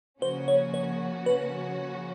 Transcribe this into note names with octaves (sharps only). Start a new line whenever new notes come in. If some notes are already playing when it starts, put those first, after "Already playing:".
C#3 F3 A#3 C#4 F#4 C5
C#5
C#5
B4